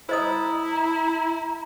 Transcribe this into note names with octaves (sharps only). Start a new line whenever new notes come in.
E4 C5 D#5 A#5 D#6